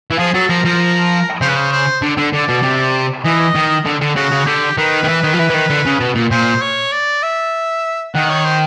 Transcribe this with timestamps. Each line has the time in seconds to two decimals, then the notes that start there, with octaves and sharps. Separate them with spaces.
0.11 E3
0.19 F3 G#4
0.34 F#3 A4
0.49 F3 A#4
0.65 F3 A#4
1.41 C#3 C5
1.48 B4
1.56 C5
1.72 C5
2.02 D3
2.18 D3
2.33 D3 D5
2.49 B2
2.63 C3
3.25 E3 D#5
3.55 D#3
3.86 D3
4.01 D3
4.16 C#3 F#4
4.32 C#3
4.47 D3 G4
4.78 D#3 B4
5.04 D#3
5.08 E3
5.24 D#3
5.34 F3
5.40 E3
5.50 E3
5.54 D#3
5.70 D3
5.85 C#3
6.00 B2
6.15 A#2
6.31 A#2 C5
6.62 C#5
6.92 D5
7.23 E5
8.15 D#3 F#5
8.30 C#5
8.45 C5